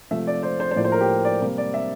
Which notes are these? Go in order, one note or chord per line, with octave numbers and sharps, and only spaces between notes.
C3 F3 A3 E5
D5
C5
C5
C5
A2 F3 A#3 D5
C5
A#4
G4
D5
C3 G3 A#3
D5
E5